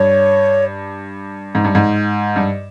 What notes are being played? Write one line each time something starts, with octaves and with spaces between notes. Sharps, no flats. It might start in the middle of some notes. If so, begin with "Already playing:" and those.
Already playing: G2 C#5
G#2
G2
G#2
G2